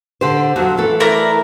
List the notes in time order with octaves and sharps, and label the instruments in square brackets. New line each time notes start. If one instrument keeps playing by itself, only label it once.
[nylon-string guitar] D3 G4 C5
F2 F#3
E3 A3 A4
[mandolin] E4 A#4 D5